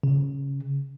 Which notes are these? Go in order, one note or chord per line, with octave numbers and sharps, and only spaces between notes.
C#3